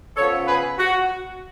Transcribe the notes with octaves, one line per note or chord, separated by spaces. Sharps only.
C#3 F3 B3 A4 C#5
G#4 B4
F#4